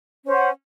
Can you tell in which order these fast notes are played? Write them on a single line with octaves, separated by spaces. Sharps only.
C#4 C5 F#5